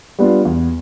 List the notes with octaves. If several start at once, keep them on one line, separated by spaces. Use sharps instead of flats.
G3 B3 D4 F4
E2